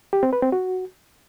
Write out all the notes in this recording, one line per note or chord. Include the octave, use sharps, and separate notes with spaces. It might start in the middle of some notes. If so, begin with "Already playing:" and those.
G4
C4
B4
C4
F#4